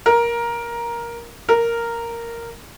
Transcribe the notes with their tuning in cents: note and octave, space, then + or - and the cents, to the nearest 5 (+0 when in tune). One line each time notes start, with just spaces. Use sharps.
A#4 +10
A#4 -5